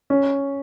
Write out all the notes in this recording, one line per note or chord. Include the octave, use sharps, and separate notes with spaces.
C#4